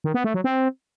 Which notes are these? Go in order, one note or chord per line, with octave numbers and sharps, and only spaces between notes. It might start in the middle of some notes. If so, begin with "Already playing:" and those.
D#3
B3
A3
F#3
C4